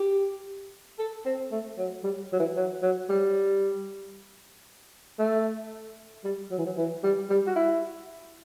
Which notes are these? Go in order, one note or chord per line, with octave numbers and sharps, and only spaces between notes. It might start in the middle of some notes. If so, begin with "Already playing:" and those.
Already playing: G4
A4
C4
A3
F#3
G3
F#3
E3
F#3
F#3
G3
A3
G3
F#3
E3
F#3
E3
G3
G3
F#4
E4